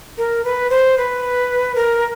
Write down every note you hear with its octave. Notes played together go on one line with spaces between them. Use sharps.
A#4
B4
C5
B4
A#4